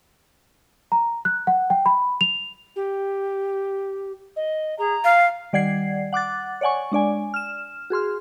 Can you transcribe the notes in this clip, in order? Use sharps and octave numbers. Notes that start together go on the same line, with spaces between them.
A#5
F#6
F#5
G5
B5
F7
G4
D#5
G#4 A#5
F5
D#3 G3 D5 F#5 G#6 C7
F#5 D6 F#6 A6
C#5 D5 F#5 G#5 C#6
G#3 D4 D5 G#5
F6 E7
F#4 G#4 C6 F6